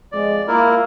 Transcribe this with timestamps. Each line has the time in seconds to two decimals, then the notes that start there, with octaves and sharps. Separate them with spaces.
0.12 F2 G#3 D5
0.48 A#3 E4 F4 A#4